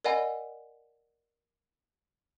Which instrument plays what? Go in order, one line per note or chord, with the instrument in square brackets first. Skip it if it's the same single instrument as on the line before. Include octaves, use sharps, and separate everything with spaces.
[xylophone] A#4 D5 D#5 F#5 G#5 B5